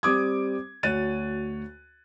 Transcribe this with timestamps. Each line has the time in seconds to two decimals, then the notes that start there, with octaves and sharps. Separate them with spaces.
0.03 G3 C4 G4 D6 D#6 G#6
0.83 D2 F#4 C#5 F#6 A6 D#7